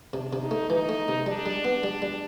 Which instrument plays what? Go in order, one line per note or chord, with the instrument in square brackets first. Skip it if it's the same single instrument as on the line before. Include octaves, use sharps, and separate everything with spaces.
[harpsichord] C3 [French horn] D4
[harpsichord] C3
[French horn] D#4
[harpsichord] A3
[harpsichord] E3 [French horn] D#4
[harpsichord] A3
C3
[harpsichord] G3 [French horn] D4
[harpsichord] G3
B3
G3
G3